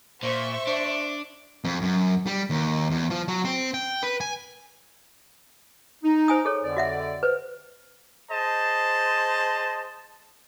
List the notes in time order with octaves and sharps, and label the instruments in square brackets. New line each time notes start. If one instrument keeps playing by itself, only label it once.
[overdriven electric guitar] A#2 [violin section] C5 E5 C#6
[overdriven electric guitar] D4
[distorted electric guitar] F2
F#2
G3
D#2
E2
F3
F#3
C4
G5
B4
G#5
[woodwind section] D#4
[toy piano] C5 G#5 D#6
G#4 A4 C#5
[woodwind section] F2 D3 D5
[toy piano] F#4 E5 F#5
B4 C5
[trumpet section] G#4 C5 D#5 A5